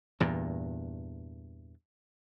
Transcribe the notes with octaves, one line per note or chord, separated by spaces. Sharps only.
E2 G2 A#2